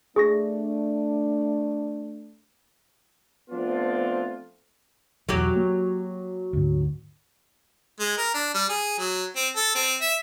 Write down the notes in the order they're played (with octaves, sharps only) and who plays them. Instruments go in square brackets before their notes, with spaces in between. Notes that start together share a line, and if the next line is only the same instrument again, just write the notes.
[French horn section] A3 D4 [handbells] G#4 C#6 A#6
[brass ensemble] F3 A3 B3 C4 D4 F4
[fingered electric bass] B1 E2 [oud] F#3 F#4 G4
[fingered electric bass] A#3
D2 G#2
[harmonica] G#3
A#4
D4
G3
G#4
F#3
C4
A4
C4
E5